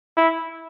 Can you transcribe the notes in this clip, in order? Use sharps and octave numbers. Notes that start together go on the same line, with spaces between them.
E4